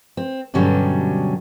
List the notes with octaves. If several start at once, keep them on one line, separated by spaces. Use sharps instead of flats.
C4
G2 B2 D3 F#3 G3 C#4